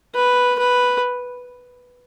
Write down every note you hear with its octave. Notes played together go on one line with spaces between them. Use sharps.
B4
B4